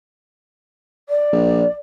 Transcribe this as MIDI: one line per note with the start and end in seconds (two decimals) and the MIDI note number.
1.09 1.72 74
1.32 1.64 34